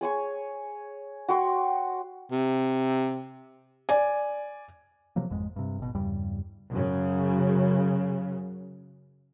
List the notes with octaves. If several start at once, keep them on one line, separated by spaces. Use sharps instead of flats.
G#4 C#5 G#5 C#6
F#4 G5 C6 C#6
C3
D5 G#5
C3 F3 F#3 A#3
G#1 F2 G#2 G#3
G2 C3
G#1 B2
E2 G2 C#3 G3
F#2 C#3